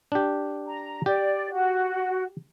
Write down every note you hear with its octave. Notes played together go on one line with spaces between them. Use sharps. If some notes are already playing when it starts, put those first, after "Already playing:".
D4 G4
A#5
G4 D5
F#4